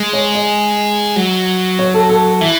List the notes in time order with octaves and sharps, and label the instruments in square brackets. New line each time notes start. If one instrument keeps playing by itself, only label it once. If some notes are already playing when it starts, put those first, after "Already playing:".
Already playing: [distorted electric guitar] G#3
[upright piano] C#5
D#5
[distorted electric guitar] F#3
[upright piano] C#5
A4
A4
A4
[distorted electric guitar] E3 [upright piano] E5